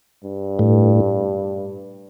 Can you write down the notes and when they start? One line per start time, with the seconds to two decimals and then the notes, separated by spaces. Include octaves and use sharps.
0.24 G2
0.59 A2